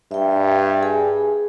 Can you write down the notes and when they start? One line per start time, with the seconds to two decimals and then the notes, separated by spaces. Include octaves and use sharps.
0.11 G2 E5 G5
0.83 G#4 G#5